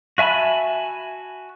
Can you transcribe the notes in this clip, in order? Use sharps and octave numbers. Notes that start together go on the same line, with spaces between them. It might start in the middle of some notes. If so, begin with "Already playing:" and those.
F#4 E5 G#5 A5 B5